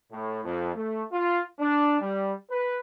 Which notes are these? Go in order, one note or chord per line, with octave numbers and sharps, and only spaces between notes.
A2
F2
A3
F4
D4
G3
B4